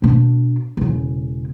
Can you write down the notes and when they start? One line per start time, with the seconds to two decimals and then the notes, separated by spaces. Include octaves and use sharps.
0.02 B2 D4
0.77 E1 C#3